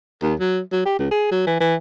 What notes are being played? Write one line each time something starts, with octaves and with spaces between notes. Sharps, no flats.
D#2
F#3
F#3
G4
C#2
G#4
F#3
E3
E3